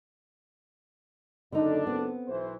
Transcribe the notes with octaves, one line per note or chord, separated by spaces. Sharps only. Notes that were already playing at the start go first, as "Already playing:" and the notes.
F#1 D3 D4 D#4 A4
B3 C4
B1 E3 C5